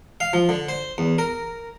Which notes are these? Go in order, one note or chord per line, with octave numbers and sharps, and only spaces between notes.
F5
F3
D3
C5
E2
A#4